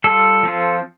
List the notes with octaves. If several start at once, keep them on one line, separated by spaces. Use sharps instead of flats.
G3 F4 A4
F3 C4 F4